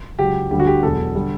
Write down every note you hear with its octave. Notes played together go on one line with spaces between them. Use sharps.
C#2 C#3 F#3 G4
D2 D3 G3 G4
F#4
G4
E1 E2 B2 F#3 A4
D3 G3